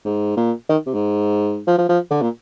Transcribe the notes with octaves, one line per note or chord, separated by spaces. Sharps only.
G#2
A#2
D#3
C3
G#2
F3
F3
F3
D3
A#2